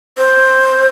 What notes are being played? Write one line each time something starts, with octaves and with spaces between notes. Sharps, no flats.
C5